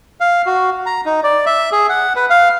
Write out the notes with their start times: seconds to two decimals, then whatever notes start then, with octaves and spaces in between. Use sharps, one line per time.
0.20 F5
0.46 F#4
0.86 A#5
1.05 D#4
1.23 D5
1.46 E5
1.72 G#4
1.89 F#5
2.16 B4
2.30 F5